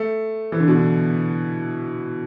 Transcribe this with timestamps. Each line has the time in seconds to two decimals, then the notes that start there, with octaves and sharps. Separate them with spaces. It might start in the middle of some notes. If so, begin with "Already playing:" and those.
Already playing: A3
0.52 E3
0.60 D3
0.68 B2
0.75 D3